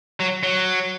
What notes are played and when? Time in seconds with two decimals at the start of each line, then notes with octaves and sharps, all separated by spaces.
0.20 F#3
0.43 F#3